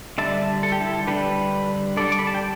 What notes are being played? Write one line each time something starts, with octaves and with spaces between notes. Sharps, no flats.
D3 G3 D4 E5 A5
A4
G4
E4 A4
D3 G3 D4 G4 B4
D3 G3 D4 A4 D5
D6
B5
A5
G5